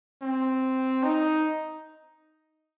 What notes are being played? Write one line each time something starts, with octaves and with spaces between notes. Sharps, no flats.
C4
D#4